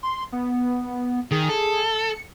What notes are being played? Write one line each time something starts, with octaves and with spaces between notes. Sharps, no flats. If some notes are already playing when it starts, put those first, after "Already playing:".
C6
B3
D#3 G#4
A4
C#7